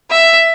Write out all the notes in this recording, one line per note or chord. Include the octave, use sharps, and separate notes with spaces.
E5